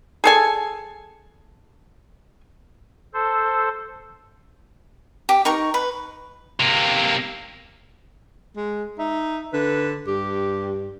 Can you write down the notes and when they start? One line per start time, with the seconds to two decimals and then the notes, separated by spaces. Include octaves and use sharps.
0.24 G#4 A4 G#5
3.14 A4 C5
5.29 G4
5.45 D#4 A#4 C#6
5.74 B4
6.60 C3 A#3
8.57 G#3
8.99 D#4 E5
9.53 D3 B4
10.07 G2 G4